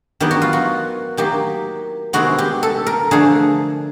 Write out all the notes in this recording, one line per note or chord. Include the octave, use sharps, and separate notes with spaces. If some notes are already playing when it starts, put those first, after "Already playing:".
D#3 F#3 B3 G4
F#4
F4
F#4
D#3 F#3 A#3 G4
C3 D#3 G#3 B3 F#4
G4
A4
A#4
D3 F3 A3 G#4